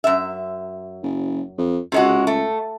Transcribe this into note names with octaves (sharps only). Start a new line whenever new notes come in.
F#2 E5
F#1
F2
C#2 C3 G#3 F#4
A3